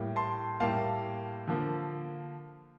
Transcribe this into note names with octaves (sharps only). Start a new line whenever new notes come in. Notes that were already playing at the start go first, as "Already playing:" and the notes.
Already playing: A2 G3 A#3
A5 C6
A2 G3 A#3 F5 A5
D3 F3 A#3